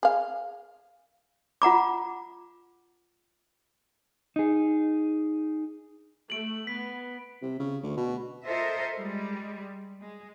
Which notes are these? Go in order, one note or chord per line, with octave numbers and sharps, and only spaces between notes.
G#4 F5
F4 F#5 A#5 D6
D#4 G#4
A3 D7 F#7
B3 B6
C3
C#3
D2
B2
F4 A4 A#4 C5 D#5 E5
G3 G#3
G#3